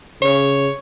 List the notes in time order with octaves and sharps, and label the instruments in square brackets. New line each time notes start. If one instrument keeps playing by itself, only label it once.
[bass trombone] C#3 [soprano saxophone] C#5